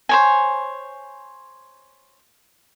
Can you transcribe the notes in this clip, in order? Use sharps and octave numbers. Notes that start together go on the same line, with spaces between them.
C5 C#5 G#5